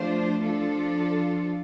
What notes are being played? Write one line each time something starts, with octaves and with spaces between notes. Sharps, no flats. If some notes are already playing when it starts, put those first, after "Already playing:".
Already playing: F3 A3 D4 F4 C5
F3 D4 F4 A4